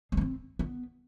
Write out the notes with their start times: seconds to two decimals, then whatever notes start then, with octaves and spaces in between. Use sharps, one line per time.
0.12 G#3
0.17 B3
0.21 C4
0.59 B3